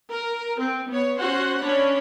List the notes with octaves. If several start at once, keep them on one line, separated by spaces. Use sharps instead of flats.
A#4
C4
B3 C#5
C#4 F#4 C5 F#5 C6
C#4 D4 C#5 B5